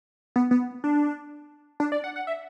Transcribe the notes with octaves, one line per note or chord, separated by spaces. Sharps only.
B3
B3
D4
D4
D5
F#5
F#5
E5